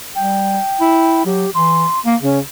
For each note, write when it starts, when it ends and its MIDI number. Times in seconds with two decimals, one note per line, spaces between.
0.15 0.59 55
0.15 1.25 79
0.81 1.24 64
1.26 1.46 54
1.26 1.50 67
1.55 1.85 52
1.55 1.99 84
2.06 2.16 58
2.23 2.41 49
2.23 2.39 61